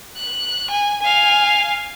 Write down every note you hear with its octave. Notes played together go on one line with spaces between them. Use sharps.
F#6
G#5
F5 G#5